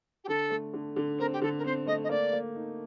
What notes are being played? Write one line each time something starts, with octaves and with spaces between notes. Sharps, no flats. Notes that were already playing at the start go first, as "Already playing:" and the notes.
G4
D3 A4
A3
D3
D3
C4 A#4
G4
D3 A4
A#4
C4 C5
A3 D#5
D#5
A#3 D5
A#3
D#4